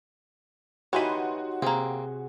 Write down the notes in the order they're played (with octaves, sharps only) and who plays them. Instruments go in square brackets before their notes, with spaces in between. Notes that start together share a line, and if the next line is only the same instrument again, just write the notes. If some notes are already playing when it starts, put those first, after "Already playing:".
[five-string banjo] E3 B5 [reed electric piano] D#4 G4 C#5 [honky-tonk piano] F#4 C6 D#7
[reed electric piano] C3 G#4 [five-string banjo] A#3 C4